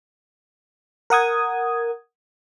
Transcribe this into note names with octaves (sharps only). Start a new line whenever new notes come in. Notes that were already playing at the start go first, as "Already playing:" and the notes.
A#4 F#5 D#6 G#6